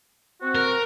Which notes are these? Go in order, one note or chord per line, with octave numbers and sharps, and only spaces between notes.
C4 F#4
A#4